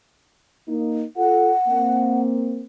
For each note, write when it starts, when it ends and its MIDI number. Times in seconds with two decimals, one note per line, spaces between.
0.68 1.03 58
0.68 1.03 63
1.17 1.52 65
1.17 1.52 69
1.17 2.20 78
1.68 2.65 58
1.68 2.65 60